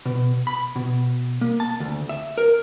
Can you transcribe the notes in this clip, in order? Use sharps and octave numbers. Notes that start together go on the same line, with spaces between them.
B2
B5
B2
A#3
A5
D2
E5
A#4